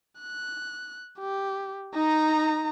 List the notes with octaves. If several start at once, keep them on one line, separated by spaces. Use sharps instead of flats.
F#6
G4
D#4 A#5